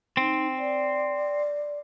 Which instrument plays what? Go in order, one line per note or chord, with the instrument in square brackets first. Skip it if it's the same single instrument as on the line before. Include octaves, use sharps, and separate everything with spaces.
[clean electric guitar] C4 [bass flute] D#4
[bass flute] D5